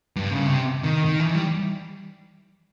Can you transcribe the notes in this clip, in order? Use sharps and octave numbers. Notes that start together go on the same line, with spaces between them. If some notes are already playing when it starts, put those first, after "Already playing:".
G2
C#3
C3
D#3
D#3
E3
G3